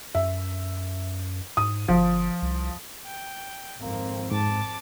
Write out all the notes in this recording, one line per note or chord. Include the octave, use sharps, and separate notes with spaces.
F#2 E5
G#2 D#6
G1 F3
C2
G5
G#1 F2 A#3 C4
G#2 A5 D6